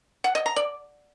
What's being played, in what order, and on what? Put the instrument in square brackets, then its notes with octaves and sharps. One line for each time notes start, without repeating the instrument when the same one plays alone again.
[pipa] F#5
D#5
A#5
D5